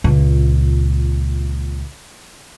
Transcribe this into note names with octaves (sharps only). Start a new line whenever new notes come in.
C#2 A#2